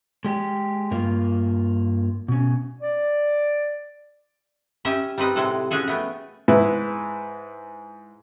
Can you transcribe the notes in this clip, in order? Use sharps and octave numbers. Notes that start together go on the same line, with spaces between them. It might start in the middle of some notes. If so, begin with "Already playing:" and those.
G#3 G4
G2 A#3 F4
B2 C#4
D5
C#4 G4 D#5 E5 G5
G3 C4 D#4 B4 D#5
A2 C3 G#3 A4 F#5
C#4 D4 F#4 G#4 A4
A3 B3 G5
G#2 E4 B4